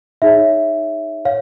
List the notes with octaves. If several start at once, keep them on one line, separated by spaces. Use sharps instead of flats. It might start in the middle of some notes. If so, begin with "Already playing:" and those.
D#4 G#4 C#5 E5
C#5 F5